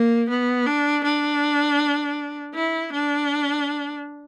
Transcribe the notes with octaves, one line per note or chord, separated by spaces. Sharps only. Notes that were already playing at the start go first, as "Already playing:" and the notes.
Already playing: A#3
B3
D4
D4
E4
D4